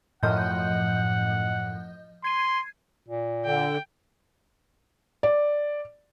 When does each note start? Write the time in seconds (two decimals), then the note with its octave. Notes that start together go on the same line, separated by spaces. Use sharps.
0.23 F#2 A2 F3 D#5 F#5 G6
2.24 C6 G#6 C7 D#7
3.08 A#2
3.45 D3 G5
5.23 D5